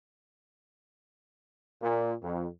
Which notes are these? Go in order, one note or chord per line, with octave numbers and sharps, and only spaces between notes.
A#2
F2